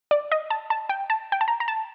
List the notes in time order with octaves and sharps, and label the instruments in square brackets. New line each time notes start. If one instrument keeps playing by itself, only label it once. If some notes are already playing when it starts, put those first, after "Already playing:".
[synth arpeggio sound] D5
D#5
A5
A5
G5
A5
G5
A5
A#5
A#5
A5